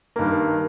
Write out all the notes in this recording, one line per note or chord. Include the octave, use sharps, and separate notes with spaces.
G2 D#3 A#3